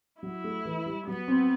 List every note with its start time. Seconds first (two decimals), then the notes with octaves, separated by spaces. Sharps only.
0.22 F#3 E4
0.44 A3
0.65 E3
0.86 G3
1.07 F#3 B3
1.28 C4